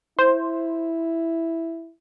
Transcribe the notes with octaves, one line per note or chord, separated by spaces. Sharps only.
E4 C5